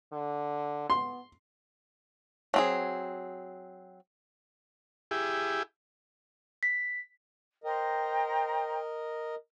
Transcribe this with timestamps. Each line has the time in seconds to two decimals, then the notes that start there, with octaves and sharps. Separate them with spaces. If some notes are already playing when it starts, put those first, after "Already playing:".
0.13 D3
0.90 B3 C6
2.54 F#3 C4 G#4
5.11 E4 G4 G#4
6.63 B6
7.64 A#4 C5 D#5 G5 A#5